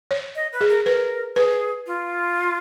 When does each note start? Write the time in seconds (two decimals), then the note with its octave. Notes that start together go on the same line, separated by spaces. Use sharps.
0.11 C#5
0.35 D#5
0.52 B4
0.61 G#4
0.69 A#4
0.86 A#4 B4
1.36 G#4 B4
1.87 F4